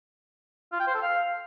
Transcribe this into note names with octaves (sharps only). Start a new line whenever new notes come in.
F4
G5
C5
A4
F5